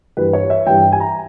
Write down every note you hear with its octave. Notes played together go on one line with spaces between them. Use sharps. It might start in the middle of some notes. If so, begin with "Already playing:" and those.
G2 E3 G3 B4
C#5
E5
G2 E3 G3 G5
G#5
A#5